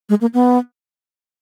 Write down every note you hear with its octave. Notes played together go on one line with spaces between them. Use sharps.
G#3
A#3
B3